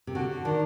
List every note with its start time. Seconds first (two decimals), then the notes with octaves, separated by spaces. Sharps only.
0.07 C3
0.14 D3 F#4
0.30 F#4
0.44 D#3 D4